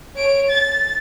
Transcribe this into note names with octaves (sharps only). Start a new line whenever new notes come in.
C#5 D7
A6